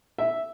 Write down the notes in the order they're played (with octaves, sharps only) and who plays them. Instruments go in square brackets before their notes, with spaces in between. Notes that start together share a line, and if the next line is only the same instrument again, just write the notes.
[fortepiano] E5